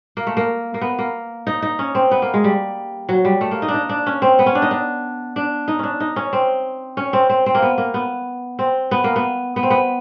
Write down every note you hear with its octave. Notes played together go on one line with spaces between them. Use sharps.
A#3
A3
A#3
A#3
B3
A#3
D#4
D#4
C#4
C4
B3
A#3
G#3
G3
F#3
G3
A3
A#3
D#4
D4
D#4
D4
C#4
C4
B3
C#4
D4
D#4
D4
D4
D#4
C#4 D4
D#4
C#4
C4
C#4
C4
C4
C4
A#3
B3
A#3
B3
C4
B3
A#3
B3
B3
C4
B3